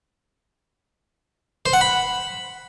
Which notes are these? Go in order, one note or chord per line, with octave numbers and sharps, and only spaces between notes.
C5
F#5
B5